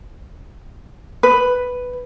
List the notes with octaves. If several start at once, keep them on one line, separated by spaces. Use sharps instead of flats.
B4